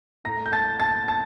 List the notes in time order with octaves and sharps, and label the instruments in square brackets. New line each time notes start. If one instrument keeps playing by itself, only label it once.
[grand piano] A2 A3 A#5 A#6
G6
A5 A6
A5 A6
A5 A6